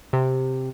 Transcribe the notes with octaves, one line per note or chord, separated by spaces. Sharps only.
C3